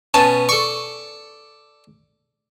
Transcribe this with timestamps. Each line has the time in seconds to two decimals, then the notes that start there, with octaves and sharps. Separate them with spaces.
0.14 B2 B3 C#4 A5
0.49 A4 D5 C#6